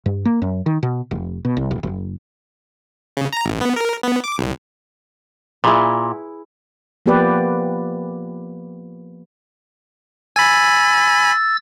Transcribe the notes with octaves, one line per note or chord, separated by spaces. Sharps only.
G2
A#3
F#2
D#3
B2
F1
B2
C2
D#1
F#1
C#3
A#5
A1
B3
A#4
B3
D6
C2
A#2 E4 G#4 B4
F3 A#3 B3 G4 B4 D5
G#5 B5 E6 A6